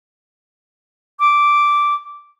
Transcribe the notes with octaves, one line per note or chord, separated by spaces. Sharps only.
D6